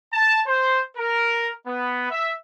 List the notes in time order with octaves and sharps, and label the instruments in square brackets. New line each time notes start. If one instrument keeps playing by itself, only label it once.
[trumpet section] A5
C5
A#4
B3
E5